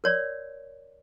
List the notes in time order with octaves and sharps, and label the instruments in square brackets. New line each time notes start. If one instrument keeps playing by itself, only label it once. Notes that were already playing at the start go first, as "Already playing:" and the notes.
[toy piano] A#4 C#5 D5